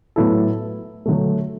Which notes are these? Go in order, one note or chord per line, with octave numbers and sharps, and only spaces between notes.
A2 F#3 B3 E4 A4
D3 F#3 A3